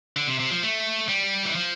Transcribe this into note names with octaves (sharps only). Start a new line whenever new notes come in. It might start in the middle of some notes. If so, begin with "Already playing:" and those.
D3
C3
C3
F3
A3
G3
E3
F3